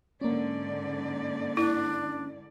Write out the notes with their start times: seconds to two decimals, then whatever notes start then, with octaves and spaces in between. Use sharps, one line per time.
0.21 G#2 D3 A#3 C#4 D5
1.57 D4 E4